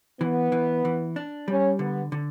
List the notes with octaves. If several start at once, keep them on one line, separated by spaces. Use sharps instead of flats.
E3 B3
E3
E3
D4
G3 C#4
D3 B3
D3